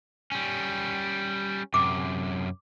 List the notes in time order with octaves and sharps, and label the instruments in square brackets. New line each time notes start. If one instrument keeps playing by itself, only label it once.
[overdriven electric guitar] G3 C#4
[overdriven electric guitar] F#2 C3 [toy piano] D6